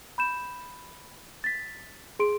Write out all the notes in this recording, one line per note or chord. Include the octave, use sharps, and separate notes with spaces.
B5 G6 E7
A6 B6
G#4 C6 D7